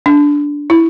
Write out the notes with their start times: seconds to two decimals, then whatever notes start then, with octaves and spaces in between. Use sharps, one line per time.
0.06 D4
0.70 E4